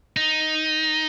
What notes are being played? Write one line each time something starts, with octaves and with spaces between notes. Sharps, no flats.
D#4